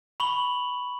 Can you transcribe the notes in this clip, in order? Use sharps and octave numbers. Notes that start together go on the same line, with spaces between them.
B5 C#6 F#7 G7